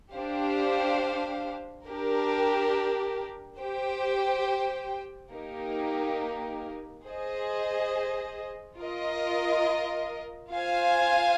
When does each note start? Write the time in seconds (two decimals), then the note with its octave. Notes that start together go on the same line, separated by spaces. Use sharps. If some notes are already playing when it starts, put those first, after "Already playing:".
0.13 D4 G4 C5 F5
1.86 D4 G4 A#4
3.59 G4 C5 G5
5.32 A#3 D#4 G4 A#4
7.06 G#4 C5 D#5
8.79 F4 A#4 D#5
10.51 F4 C5 F5 G#5